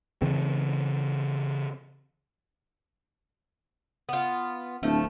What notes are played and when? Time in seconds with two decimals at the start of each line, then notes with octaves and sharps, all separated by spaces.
0.22 C#3 E3 C4
4.09 B3 F4
4.83 D1 F3 A3